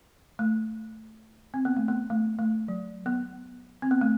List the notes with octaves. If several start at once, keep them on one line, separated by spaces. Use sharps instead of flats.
A3
C4
B3
A3
B3
A3
A3
F#3
B3
C4
B3
A3